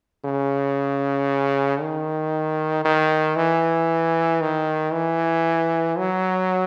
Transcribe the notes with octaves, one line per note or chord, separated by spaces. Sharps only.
C#3
D#3
D#3
E3
D#3
E3
F#3